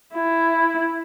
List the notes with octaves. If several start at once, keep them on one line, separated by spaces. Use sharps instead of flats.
E4